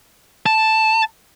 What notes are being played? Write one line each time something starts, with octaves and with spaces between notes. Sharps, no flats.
A5